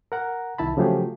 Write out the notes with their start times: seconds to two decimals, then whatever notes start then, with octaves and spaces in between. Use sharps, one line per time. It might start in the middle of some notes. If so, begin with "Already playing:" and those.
0.12 A#4 F#5 A#5
0.58 C2 D#3 E4 A5 B5
0.77 C#3 F3 F#3 A3 G4 G#4